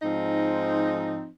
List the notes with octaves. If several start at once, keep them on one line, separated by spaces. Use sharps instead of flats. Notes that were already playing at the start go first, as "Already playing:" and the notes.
G#2 F3 C4 D#4